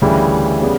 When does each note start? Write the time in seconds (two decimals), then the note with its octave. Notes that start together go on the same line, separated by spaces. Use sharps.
0.02 D2 C#3 E3 G3
0.62 C#3 G3 B3